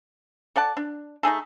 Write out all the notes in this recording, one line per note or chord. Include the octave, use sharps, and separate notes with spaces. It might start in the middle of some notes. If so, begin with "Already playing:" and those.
A4 D5 F#5 A5
D4
A3 D#4 G#4 A4